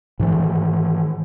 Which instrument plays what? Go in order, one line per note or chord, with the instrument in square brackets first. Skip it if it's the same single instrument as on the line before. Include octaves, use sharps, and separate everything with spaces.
[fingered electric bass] G#2 D#3 E3